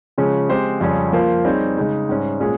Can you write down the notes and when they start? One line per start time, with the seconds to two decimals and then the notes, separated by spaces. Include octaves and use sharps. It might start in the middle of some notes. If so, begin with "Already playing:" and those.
0.18 C#3 F3 G#3 C#4
0.49 G#3 C4 G4 C5
0.81 F2 C#3 G3 C#4 G#4
1.13 F3 A#3 F4 C5
1.45 G3 C4 D#4 G#4 C#5
1.77 C#3 G#3 D#4
2.09 G#2 G3 C#4
2.40 A#2 G#3 C#4 G#4 C#5